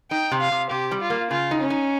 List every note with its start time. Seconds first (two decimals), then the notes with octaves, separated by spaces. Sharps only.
0.11 D#4 G5
0.32 C3
0.40 F5
0.52 C3
0.71 C3 G4
0.91 G3
1.01 F4
1.10 A#3
1.31 C#3 F4
1.51 D#4
1.60 C#4
1.70 D#4